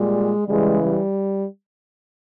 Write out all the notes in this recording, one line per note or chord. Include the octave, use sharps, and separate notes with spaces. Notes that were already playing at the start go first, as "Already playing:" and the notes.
Already playing: A#2 G3 G#3
C#3 E3 G3 G#3
G3